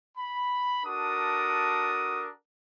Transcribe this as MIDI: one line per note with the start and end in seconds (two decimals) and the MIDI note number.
0.18 0.81 83
0.85 2.30 62
0.85 2.30 66
0.85 2.30 69
0.85 2.30 70
0.85 2.30 87